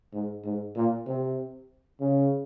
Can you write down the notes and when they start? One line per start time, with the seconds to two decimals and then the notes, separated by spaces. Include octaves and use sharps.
0.13 G#2
0.44 G#2
0.76 A#2
1.07 C3
2.00 C#3